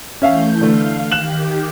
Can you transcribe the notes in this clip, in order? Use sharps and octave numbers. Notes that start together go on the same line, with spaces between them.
E3 A3 C#4 E5 F5 G6
D3 A3 F5
D#3 G4 F#6 E7 F#7